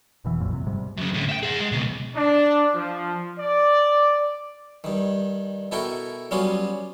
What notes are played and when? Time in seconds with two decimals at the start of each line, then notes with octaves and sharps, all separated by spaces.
0.25 F1 B2 E3
0.40 F1 A#1 F#2 A#2
0.53 C3
0.67 G#2 C3 G3
0.97 F#2 C#3
1.14 A2 D3
1.29 E5 G5
1.43 G#4 F#5
1.59 G#3
1.72 C#2 B2
2.16 D4
2.74 F3
3.38 D5
4.84 G2 D#3
5.72 B2 E4 A4 A#4 G5 C#6
6.31 F#3 G3 B3 C#4 F4 F#4